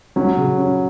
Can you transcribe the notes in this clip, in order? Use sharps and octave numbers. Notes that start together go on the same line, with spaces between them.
F#3 C#4
C#3
C#4